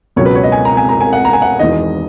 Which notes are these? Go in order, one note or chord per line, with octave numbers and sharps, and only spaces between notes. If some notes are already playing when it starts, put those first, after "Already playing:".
C#2 B2 F#3 C#4 C#5
B4
C#5
D#5
G#5
A#5
G#5
A#5
G#5
F#5
A#5
G#5
F#5
E1 E2 D#3 D#5